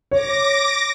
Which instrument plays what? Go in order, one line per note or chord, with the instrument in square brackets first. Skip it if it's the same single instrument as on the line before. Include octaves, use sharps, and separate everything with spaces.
[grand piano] C#5 [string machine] D6 A#6